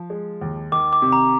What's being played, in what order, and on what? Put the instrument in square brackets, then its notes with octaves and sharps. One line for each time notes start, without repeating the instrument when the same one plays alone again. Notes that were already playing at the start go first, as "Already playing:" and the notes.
Already playing: [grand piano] F3
G#3
D#2
[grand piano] D#3 [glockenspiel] D6
[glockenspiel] D6
[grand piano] C3
[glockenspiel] A#5